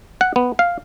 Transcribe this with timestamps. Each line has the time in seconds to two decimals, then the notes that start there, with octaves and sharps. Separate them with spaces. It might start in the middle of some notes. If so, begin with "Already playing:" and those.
0.21 F#5
0.36 B3
0.59 F5